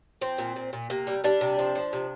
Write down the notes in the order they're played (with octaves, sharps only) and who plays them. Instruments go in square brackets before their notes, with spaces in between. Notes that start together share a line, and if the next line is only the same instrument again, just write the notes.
[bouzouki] F3 C4
A#2
A#2
A#2
C3 A#3
G3
G3 D4
C3
F3
F3
C3